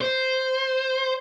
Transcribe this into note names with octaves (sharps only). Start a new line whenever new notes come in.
C5